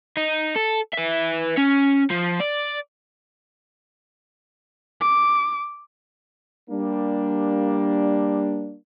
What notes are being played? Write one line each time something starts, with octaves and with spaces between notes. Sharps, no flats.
D#4
A4
B4 E5
C#4
F3
D5
D6
G3 A#3 D4